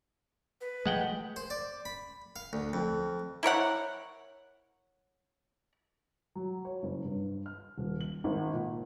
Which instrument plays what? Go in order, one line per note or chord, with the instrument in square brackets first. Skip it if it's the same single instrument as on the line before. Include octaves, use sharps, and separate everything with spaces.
[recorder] B4
[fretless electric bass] F3 A3 [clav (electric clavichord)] G#3 F#5 G5
[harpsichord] C5
D5
B5
F5
D2
F2
[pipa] E4 A#4 C#5 F#5
[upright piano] F#3
C#5
F#1
G2
F6
D#1
F#7
G#1
A#2